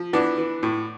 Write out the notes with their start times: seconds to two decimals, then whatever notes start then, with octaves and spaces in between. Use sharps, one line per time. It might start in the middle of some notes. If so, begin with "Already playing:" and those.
Already playing: F3
0.13 E3 B3 D4
0.38 E3
0.63 A2